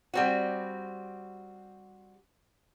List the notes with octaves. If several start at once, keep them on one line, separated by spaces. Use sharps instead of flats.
G3 C4 F#4